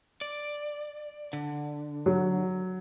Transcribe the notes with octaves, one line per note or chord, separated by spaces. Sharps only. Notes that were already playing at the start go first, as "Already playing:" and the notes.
D5
D3
F#3